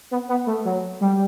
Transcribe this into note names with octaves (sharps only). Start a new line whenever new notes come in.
B3
B3
A3
F#3
G3